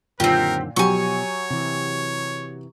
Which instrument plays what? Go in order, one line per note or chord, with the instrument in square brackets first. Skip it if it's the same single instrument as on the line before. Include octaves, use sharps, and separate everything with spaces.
[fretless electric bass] F#2 D3 D#3 [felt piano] A#2 [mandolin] C4 G4 [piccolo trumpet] A#4
[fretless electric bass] B2 F3 [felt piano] F#3 G4 [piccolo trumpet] C#5 [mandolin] G#5 C#6
[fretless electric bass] C3 E3